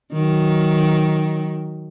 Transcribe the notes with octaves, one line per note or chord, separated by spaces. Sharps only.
D#3 F#3